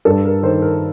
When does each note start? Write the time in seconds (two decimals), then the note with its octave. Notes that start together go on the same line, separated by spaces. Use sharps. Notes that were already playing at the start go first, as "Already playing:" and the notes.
0.05 G2 A4
0.25 A#4
0.43 D#3 C5
0.62 A#4